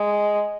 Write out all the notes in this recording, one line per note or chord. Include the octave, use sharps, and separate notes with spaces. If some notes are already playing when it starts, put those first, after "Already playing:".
Already playing: G#3